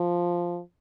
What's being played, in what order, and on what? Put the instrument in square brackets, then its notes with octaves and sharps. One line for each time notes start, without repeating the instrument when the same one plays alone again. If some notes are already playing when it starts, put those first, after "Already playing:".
Already playing: [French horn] F3